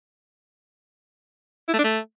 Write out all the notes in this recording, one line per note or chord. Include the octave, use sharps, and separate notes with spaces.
E4
A3
D4
A3